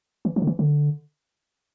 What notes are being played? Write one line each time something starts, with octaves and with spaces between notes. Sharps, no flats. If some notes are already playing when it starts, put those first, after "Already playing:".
E3
F3
D3
E3
D3